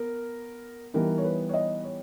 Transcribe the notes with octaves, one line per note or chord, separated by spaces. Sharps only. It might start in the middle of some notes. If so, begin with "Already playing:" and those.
Already playing: B3 A#4
E3 G3 B3 D#4 A#4
C#5
B4
C#5
D#5
C#5